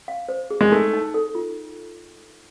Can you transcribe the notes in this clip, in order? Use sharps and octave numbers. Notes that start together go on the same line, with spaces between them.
F5
C5
G#4
G#3
A3 D#4
D#4
A4
F4